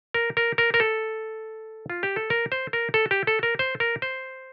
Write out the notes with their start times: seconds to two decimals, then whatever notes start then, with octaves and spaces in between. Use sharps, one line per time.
0.14 A#4
0.37 A#4
0.58 A#4
0.74 A#4
0.80 A4
1.90 F4
2.03 G4
2.16 A4
2.30 A#4
2.52 C5
2.73 A#4
2.94 A4
3.11 G4
3.27 A4
3.43 A#4
3.59 C5
3.80 A#4
4.02 C5